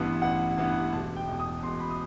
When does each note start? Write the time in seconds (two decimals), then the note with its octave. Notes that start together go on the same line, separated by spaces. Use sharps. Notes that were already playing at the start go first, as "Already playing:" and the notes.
Already playing: A1 G2 E3 B3 E5
0.22 A1 F#5
0.58 G2 E3 B3
0.92 E1 A5
1.16 G5
1.27 E2 B2
1.39 D#6
1.63 E1 C6
1.80 B5
1.91 D#6